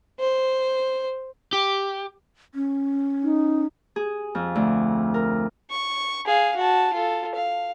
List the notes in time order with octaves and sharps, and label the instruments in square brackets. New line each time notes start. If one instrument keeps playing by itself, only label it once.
[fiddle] C5
[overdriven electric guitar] G4
[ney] C#4
[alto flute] D#4
[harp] G#4
F2
D2
A#4
[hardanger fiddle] C#6
G#4 F5
F#4 A5
F4 A4
F5